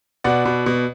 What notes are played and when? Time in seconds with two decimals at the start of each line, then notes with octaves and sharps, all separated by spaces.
0.24 B2 D5 F#5
0.46 B2
0.66 B2